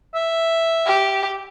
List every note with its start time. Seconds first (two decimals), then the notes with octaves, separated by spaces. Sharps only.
0.15 E5
0.86 G4